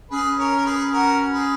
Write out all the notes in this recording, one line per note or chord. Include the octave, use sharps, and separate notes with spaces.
C#4 G#4 B4
A#4 C#5
A#4
G#4 B4
F#4 A#4
G#4 B4